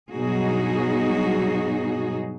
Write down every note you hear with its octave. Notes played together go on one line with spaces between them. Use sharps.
G2 B2 F#3 D#4 F#4 G#4